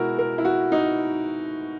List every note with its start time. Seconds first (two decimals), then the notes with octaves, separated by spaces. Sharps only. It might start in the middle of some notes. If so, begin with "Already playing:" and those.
Already playing: B2 G#3 E4 F#4 A#4
0.19 A#4
0.38 E4
0.45 F#4
0.72 D#4